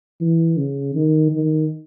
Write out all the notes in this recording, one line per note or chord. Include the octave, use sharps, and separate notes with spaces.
E3
C#3
D#3
D#3